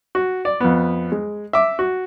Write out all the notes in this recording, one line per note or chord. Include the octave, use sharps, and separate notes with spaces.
F#4
D5
F2 B3
G#3
E5 D6
F#4